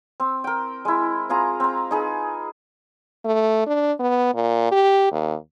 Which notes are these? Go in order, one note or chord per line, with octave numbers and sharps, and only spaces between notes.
C4
A#4 G5
G#3 E4
C4 F4 G#4 A#5
C4 A#5
D#4 G#4 B4
A3
D4
B3
A#2
G4
D#2